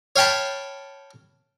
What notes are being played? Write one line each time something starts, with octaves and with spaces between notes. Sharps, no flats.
C#5 F5 G5 A5 B5